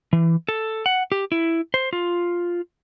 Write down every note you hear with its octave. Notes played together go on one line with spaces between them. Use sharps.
E3
A4
F#5
G4
E4
C5
F4